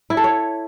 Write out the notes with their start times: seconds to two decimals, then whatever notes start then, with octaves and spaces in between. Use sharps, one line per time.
0.10 E4
0.17 A4
0.24 C#5